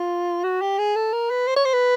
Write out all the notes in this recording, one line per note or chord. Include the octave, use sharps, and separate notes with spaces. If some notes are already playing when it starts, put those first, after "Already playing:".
Already playing: F4
F#4
G4
G#4
A4
A#4
B4
C5
C#5
C5
B4